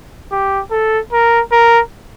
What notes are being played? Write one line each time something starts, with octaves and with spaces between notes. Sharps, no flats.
G4
A4
A#4
A#4